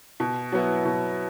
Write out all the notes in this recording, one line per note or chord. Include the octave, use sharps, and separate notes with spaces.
B2
F#3 B3 E4
B2